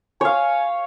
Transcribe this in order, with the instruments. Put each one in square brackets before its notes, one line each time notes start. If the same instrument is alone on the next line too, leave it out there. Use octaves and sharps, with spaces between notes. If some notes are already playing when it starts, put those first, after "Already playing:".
[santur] C#5 F5 [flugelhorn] G#5